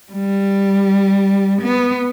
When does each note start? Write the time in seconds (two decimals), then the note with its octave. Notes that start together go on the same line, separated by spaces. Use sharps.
0.12 G3
1.62 B3